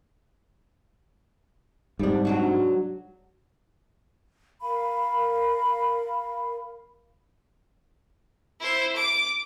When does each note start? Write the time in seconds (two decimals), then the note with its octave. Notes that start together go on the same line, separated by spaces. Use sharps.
1.99 G#2 C3 G3 D4
2.25 F#3 D4 F#4
4.61 A#4 F5 B5
8.60 E4 C5
8.96 D6